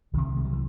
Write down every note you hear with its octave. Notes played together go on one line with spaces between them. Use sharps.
C2 C3 D#3
G#3
F#3
E3